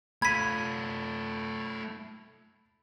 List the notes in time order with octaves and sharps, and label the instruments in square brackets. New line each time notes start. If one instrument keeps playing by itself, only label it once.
[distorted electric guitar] A3 F4 [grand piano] B5 D#7 [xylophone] G#6 B6